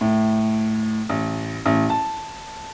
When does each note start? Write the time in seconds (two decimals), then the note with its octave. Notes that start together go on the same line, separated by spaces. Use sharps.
0.01 A2
1.10 A1
1.66 A1
1.90 A5